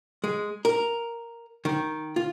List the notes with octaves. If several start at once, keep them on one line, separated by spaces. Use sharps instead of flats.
G#3
A#4
D#3
F4